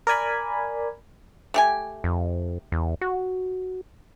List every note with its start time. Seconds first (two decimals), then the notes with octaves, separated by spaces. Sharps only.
0.07 A#4 D5 G#5 B5
1.54 A3 G4 G#5
2.04 F2
2.72 E2
3.01 F#4